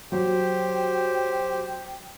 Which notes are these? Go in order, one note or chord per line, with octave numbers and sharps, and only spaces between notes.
F#3 G4 C5 G5